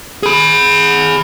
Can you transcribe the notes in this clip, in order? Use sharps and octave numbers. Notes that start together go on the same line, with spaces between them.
G#4 B5